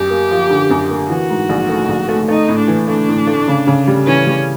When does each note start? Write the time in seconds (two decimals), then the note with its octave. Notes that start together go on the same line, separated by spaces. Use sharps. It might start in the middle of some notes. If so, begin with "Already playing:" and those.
Already playing: F#2 G4
0.10 A#3
0.31 F3
0.50 D3
0.70 F#2
0.90 A#3
1.10 E3 F#4
1.30 G#2
1.49 A#1
1.69 A3
1.89 A#1
2.08 A3
2.28 A3 D#4
2.49 A2
2.58 D4
2.68 E3
2.88 A3 D4
3.08 A2
3.27 A3
3.48 C#3
3.67 C#3
3.87 G3
4.07 E3 C#4
4.27 G3